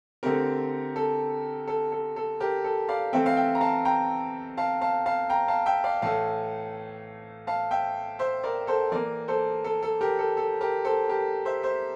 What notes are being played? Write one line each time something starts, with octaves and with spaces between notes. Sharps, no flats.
D3 A3 C4 G4 A#4
A4
A4
A4
A4
G4 A#4
A4
D5 F5
E3 A3 C4 E5 G5
F5
E5 G5
A#5
F5 A5
G5 A#5
F5 A5
F5 A5
F5 A5
G5 A#5
F5 A5
E5 G5
D5 F5
A2 E3 A3 F5 A5
F5 A5
E5 G5
C5 E5
A#4 D5
A4 C5
E3 A#3 A#4 D5
A4 C5
A4
A4
G4 A#4
A4
A4
G4 A#4
A4 C5
G4 A#4
C5 E5
C5 E5